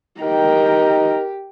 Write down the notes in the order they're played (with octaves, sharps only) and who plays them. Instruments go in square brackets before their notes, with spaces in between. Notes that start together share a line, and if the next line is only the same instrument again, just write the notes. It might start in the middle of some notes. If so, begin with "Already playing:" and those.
[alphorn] D#4 [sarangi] G4 [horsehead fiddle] A#4 G5